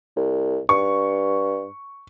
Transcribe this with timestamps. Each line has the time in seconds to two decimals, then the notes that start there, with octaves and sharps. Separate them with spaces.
0.17 C2
0.69 G2 C#6